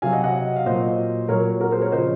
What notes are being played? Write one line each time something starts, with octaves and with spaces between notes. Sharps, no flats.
C3 F#3 F5 G#5
D#5 F#5
D#5 F#5
F5
A#2 F#3 C5 D#5
A#2 F#3 A#4 C#5
F#4 A#4
G#4 C5
A#4 C#5
C#3 F3 C5 D#5